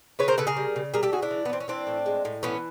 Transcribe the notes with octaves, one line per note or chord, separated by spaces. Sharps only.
C#3 B4 C#5
A#4 C5
C#3 A4 B4
G#4 A#4
G3
C#3
G3 G#4 A#4
G4 A4
C#3 F#4 G#4
D4 E4
E3
B3
E3 C4
C#4
E3 C4 D4
A2
G#3
A2
E3 B3 C#4